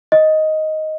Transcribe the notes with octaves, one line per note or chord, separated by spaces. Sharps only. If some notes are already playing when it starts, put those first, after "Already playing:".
D#5